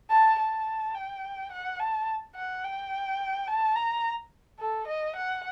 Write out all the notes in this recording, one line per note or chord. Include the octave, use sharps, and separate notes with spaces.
A5
A5
G5
F#5
A5
F#5
G5
A5
A#5
A4
D#5
F#5